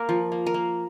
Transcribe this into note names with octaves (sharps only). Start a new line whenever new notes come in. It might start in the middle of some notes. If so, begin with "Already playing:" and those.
Already playing: A#3 A#4
F3
A#3
A#4
A#3